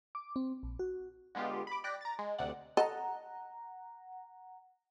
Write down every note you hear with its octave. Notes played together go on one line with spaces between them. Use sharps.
D6
C4
A#1
F#4
D3 G#3 B3 F4 G4
B5 D6
D5 G5 D6 F#6 A#6 B6
A#5 A6
G#3
D2 C3 D5 F#5
A4 D#5 F#5 A#5